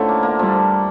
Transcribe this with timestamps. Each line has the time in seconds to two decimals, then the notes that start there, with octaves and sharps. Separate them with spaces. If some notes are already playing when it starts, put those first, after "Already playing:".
Already playing: D3 F3 A3 C#4 E4
0.09 A#3
0.23 A#3
0.39 F3 G3